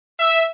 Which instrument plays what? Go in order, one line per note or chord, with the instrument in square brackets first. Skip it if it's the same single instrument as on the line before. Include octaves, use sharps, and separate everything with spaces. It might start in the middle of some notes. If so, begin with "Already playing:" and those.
[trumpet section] E5